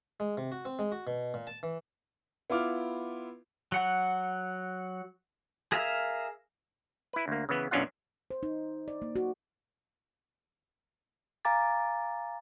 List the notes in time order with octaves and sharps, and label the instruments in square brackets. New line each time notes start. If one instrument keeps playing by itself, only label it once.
[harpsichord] G#3
C3
F#4
C4
G#3
F#4
B2
A#2
A5
E3
[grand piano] B3 E4 F4 D6 F6
[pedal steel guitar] F#3 F#5
G#4 A#4 E5 F5
[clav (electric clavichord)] E4 B4
D2 A#3
C#3 E3 B3
B1 F#2 C#4 D4 F4 F#5
[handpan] C5
D#4
D5
A#3
F#4
[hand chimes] F5 G#5 A#5 D6 A6